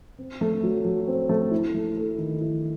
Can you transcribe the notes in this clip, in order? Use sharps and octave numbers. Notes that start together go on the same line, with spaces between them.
C4
A3
F#3
F#3
C4
A3
E4
A3
A4
D#3
E4